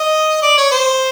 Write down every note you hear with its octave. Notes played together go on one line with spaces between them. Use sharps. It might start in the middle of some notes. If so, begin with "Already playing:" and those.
Already playing: D#5
D5
C#5
C5